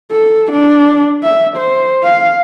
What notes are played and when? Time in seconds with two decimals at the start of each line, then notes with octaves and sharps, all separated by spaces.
0.11 A4
0.52 D4
1.23 E5
1.57 C5
2.04 F5